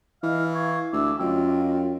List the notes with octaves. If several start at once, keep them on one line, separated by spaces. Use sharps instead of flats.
E3 D#5 F5 F6
F5 C#6 G#6
D2 E5 D6 E6
F#2 F4 D#5 G5